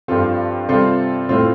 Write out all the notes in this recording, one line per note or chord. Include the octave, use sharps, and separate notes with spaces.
G2 F3 C4 F4 A4
C3 G3 C4 F4 A4
A2 A3 C4 F4